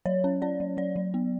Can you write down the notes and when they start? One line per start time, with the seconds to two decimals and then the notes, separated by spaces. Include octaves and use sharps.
0.06 F#3 C#5
0.24 C#4
0.42 C#4 D5
0.60 F#3
0.77 F#3 D5
0.96 F#3
1.14 B3